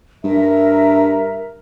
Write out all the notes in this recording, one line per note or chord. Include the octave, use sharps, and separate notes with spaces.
G2 A#4 E5 A#5